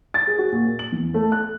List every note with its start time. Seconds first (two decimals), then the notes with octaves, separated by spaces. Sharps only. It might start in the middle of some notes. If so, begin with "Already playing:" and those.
0.14 A6
0.27 G#4
0.39 F#4
0.52 A#2
0.65 A#2
0.79 F#7
0.92 E2
1.14 A3
1.32 F#6